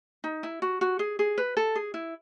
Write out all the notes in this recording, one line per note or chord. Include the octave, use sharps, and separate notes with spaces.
D#4
E4
F#4
F#4
G#4
G#4
B4
A4
G#4
E4